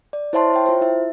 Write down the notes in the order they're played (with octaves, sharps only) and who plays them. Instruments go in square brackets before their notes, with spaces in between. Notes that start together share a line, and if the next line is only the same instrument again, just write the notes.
[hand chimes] D5
E4 C5 C#5 E5 A5 C6
C#5 E5 G5
F4 C5
E4 E5